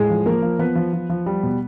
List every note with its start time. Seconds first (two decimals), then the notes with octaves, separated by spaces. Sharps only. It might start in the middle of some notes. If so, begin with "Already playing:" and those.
Already playing: A2 G#3 G#4
0.10 F3
0.26 F3 A#3 A#4
0.42 F3
0.59 F3 B3 B4
0.75 F3
0.93 F3
1.09 F3
1.26 G3
1.43 B2